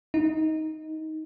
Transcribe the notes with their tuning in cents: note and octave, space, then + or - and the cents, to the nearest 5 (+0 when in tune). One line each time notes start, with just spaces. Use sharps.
D#4 +15